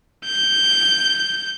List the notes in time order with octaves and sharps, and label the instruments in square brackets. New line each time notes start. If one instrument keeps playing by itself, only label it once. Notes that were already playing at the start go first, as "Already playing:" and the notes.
[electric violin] G6